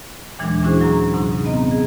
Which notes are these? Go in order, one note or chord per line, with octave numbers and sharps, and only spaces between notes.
D#2 A#2 E3 F#3 G#3 D4
C#4 D4 E4 F#4 G#4 C5
F#3 C#4 A#5
G#2 C3 F#3 D#4
B3 C4 D#5 A#5
G#4